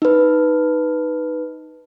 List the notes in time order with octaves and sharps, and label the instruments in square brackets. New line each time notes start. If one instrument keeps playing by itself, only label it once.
[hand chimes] D#4 B4